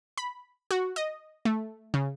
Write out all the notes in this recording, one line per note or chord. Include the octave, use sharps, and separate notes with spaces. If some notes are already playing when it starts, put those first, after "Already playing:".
B5
F#4
D#5
A3
C#3